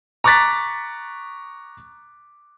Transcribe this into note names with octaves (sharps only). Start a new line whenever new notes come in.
A#5 C#6 D6 F#6 A6 B6